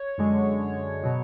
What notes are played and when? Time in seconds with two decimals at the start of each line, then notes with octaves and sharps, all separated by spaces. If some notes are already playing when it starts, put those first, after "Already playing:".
Already playing: C#5
0.18 F#2 D3 G#3
1.03 B2 F#3